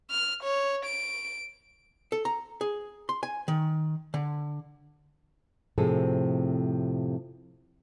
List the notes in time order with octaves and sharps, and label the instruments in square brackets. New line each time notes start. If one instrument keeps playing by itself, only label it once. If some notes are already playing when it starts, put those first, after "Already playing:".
[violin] F6
C#5
D7
[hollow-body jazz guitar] A4
A#5
G#4
C6
G#5
D#3
D3
[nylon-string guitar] F2 A2 C3 F3 G#4 A4